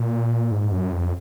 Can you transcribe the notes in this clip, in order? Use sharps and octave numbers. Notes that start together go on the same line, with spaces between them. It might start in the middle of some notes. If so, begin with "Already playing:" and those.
Already playing: A#2
G#2
F#2
F2